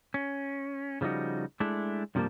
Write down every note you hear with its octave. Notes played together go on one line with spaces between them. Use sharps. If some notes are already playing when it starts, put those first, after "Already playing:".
C#4
C#3 F3 G3 D#4 F#4
G#3 A3 D4 E4
G2 C3 F3 G3 A#3 A5